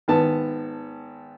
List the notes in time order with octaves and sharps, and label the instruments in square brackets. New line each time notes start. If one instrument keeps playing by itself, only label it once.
[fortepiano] G#1 B3 A5